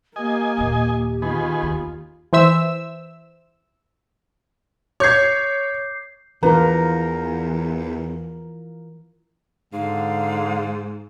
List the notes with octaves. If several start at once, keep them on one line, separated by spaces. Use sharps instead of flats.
A#3 G4 D#5 G#5
D#2 A#2
D#3 B3 F4 G#4
D#2
E3 C5 E5 E6
C#5 D6 G6 G#6 C7
E2 E3 D4 F4 A#4 B4 A#5
G#2 D3 F5